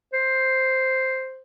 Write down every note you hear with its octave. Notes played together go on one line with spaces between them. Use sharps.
C5